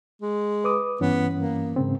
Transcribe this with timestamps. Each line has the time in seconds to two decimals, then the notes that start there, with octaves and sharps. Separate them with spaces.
0.22 G#3
0.64 B4 D6 D#6
1.01 G2 E3 B3 C#4
1.35 A#3
1.76 G#2 C#3 C4